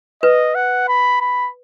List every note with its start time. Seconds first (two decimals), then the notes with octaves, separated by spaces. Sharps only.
0.22 B4 D#5
0.55 F#5
0.88 B5
1.21 B5